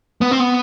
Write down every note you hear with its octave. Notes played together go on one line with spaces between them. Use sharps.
B3
C4
B3